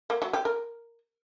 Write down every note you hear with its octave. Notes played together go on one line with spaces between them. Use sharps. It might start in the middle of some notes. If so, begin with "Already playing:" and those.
A#3
F#3
G4
A#4